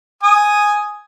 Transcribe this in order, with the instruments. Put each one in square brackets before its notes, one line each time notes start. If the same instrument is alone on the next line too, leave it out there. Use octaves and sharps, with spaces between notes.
[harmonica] G#5 D#6